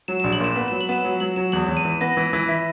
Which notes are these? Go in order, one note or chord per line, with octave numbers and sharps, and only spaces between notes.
F#3 E7
A#1 E7
F#7
A#2 E7
B3
F#3 E7
F#7
B3 E7
F#3 E7
F#3 F#7
F#3 E7
E2 F#7
E2
D#7
E3
B3 A#6
E3
E3
E4 B6